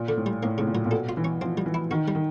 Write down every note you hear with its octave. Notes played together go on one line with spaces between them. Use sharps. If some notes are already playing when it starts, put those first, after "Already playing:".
Already playing: A#2
D3
A2
G3
A2 A#3
A2 C#3
A#2
F#3
A#2
B2 A4
F4
E3
C#4
F3 C4
G3
E3
E4
D#3 F#4
G3
D#3